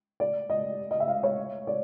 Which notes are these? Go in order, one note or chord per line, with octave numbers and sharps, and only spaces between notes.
D5
D#5
D#5
E5
F5
C#5
D5